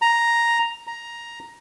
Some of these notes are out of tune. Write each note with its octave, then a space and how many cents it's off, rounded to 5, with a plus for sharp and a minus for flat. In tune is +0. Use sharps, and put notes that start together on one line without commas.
A#5 +5
A#5 +10